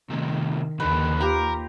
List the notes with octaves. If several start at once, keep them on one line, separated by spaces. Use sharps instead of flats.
A2 C3 D#3
D#2 D3 D#3 B4
F4 G4 A#4 A#5